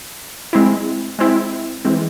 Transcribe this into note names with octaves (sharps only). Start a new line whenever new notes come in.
G#3 C4 E4
G#3 C4 E4
E3 G#3 C4